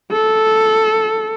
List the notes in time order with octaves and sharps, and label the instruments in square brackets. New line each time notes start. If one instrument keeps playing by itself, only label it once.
[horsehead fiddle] A4